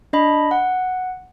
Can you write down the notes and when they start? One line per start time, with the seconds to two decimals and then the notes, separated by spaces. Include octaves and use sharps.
0.13 D4 D#5 B5
0.51 F#5